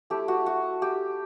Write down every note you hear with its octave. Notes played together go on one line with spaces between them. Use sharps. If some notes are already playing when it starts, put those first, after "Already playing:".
A3 E4 G4
F#4
F#4
G4